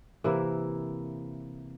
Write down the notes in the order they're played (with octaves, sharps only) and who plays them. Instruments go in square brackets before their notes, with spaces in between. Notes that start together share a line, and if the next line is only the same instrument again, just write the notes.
[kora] C3 E3 A#3 E4